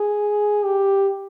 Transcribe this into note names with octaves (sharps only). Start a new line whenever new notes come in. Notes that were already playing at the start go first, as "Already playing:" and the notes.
Already playing: G#4
G4